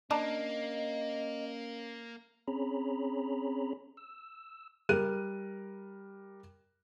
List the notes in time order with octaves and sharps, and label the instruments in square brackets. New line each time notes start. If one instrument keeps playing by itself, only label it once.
[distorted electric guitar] A#3 [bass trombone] C#4 [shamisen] D4 A5 A#5 [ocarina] D#5
[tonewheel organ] C4 C#4 G#4 C#5 A#5 B5
E6
[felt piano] G3 A#4 F#6 D#7